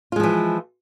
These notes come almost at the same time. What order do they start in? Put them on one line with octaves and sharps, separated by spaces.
F4 G#3 F3 E3